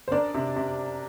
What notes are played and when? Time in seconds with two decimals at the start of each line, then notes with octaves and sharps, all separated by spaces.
0.08 C5
0.11 D4 A#4 D5
0.34 C3
0.56 C3